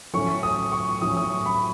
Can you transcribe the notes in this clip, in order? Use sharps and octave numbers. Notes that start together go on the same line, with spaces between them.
A2 F#3 A3 C#4 C#6
D#6
C#6
A2 F#3 A3 C#4 D#6
D#6
C#6
B5